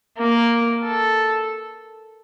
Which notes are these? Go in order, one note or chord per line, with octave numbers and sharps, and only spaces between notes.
A#3
A4